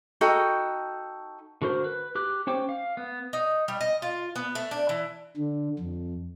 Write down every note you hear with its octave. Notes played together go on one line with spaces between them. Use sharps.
D#4 F#4 A4 G5
D3 F#4 A#4 C5
B4
G4 D6 F#6
C#4 C5 G5 D6
F5
B3
D#4
G3
D#5
F4
B3
A3
D4
E3
D3
F2